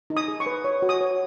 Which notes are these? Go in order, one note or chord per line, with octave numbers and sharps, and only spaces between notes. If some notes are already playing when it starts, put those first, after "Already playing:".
D#4
D#6
G#4
C#6
B4
C#5
F#4
D#6
C#5